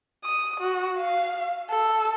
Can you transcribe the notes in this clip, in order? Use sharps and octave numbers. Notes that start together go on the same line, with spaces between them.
D#6
F#4
F5
A4